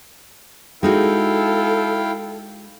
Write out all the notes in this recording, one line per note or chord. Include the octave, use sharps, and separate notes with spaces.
G#3 D#4 E4 F#4 A4 F5 G5